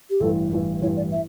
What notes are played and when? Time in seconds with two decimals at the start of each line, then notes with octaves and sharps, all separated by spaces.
0.10 G4
0.20 A1 G2 E3 A4
0.51 A1 G2 E3
0.82 A1 G2 E3 C#5
0.96 D5
1.12 E5